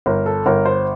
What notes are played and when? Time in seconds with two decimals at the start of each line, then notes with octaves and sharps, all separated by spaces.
0.06 G1 A#4
0.26 A4
0.46 G1 A#4
0.66 C5